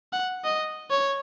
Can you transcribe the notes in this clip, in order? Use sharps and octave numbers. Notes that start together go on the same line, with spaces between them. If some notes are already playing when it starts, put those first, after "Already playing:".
F#5
D#5
C#5